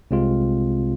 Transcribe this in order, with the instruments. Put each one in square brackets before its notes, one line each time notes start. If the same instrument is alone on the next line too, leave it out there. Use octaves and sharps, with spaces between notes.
[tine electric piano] C2 C3 G#3 C4 F4